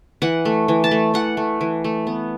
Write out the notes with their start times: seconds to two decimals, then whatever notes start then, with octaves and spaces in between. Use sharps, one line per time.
0.22 E3 F#5
0.45 A3
0.68 E3
0.84 A5
0.91 A3
1.14 E3 F#5
1.37 A3
1.61 E3
1.84 A3
2.07 B3